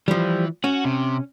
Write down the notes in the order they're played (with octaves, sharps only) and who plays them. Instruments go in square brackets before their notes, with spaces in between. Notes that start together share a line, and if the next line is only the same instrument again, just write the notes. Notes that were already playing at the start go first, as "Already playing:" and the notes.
[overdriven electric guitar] E3 [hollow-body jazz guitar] F3 G3
[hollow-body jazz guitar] C#4 [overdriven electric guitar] F#4
[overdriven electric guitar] C3